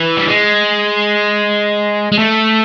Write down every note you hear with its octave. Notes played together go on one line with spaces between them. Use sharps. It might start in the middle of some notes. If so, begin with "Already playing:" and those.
Already playing: E3
G3
G#3
G#3
A3